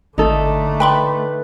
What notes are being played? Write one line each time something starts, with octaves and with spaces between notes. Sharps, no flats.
G#1 D3 A3 D#4 A4
B4 G5 B5 C6